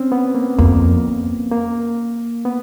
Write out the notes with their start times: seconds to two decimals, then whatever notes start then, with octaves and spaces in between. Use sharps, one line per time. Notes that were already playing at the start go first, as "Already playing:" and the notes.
Already playing: C4 C#4
0.12 B3
0.35 A#3
0.59 F2 A#3
1.51 A#3
2.45 B3